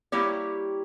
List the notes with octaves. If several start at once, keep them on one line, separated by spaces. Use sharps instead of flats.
G3 A#3 E4 G4 C#5